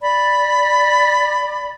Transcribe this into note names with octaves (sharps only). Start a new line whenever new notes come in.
D5 B5